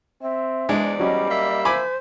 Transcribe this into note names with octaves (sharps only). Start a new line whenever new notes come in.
C4 E5
E2 G#2 G#3 D4 D5
F#3 G3 C#4 D#5
A#3 E5
C5 G#5 B5 D6